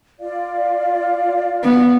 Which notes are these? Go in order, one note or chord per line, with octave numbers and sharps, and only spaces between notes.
F4 D5 F5
B3